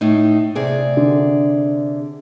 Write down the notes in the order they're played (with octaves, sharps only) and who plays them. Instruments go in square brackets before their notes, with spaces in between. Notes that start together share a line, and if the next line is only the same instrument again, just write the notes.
[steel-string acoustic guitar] A2 D#4
C3 G#4 D5
[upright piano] D3